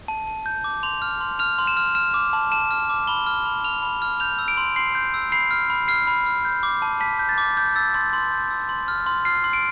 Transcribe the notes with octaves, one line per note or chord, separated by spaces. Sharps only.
A5
A5
G6
D6
C6 F7
F6
C6
F6 F7
C6
E7
F6
F6 E7
D6
A5
A5 E7
F6
D6
B5 G7
F6
B5
F6 F7
B5
F6
G6 F7
E6
D7
C6
C6 C7
G6
E6
B5 C7
F6
B5
F6 C7
B5
F6
G6
D6
A5
A5 B6
G6
A6
D6
G6
E6 A6
C6 A6
C6
G6
E6
C6
F6
C6
F6 C7
C6
D7